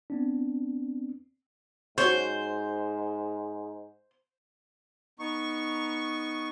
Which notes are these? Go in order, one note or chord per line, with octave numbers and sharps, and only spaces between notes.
B3 C4 D4
G#2 F#4 C5 C#5 C#6
B3 D#4 C#6